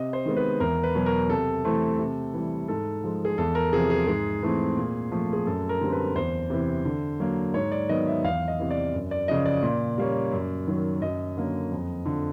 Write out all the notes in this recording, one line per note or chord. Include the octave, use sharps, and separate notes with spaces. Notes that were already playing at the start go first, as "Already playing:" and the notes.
Already playing: C3 D#5
C5
D#3 G#3 B3
B4
E2 A#4
B4
B2 F#3
A#4
C3 A4
E3 A3 C4
C3
E3 G3
G#2 A4
F3 G#3
G#4
E2 A4
A#4
C3 F3 G#4
G#4
G#2 G#4
E3 A3 C4
A#2
F3 A3 C4
G#4
F#2 A4
A#4
D3 G3 C4
B4
E2 C5
C3 E3
D3
F#3 A#3
G#2 C#5
D5
D#3 F#3 B3 D#5
E5
E2 F5
D#5
C3 E3
D5
F#2
D5
C#3 F3 D#5
D5
A#2
G3 A#3 C#4
F#2
D#3 F#3
F#2 D#5
D3 F#3 A#3 C#4
F2
D3 F3